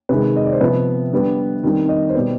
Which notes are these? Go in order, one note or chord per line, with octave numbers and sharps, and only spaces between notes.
C3 D#3 G#3 B4
D#5
D5
C5
C3 F3 B3 B4
D3 G3 B3
D#3 G3 C4
D#5
C5
B2 G3 B3 D5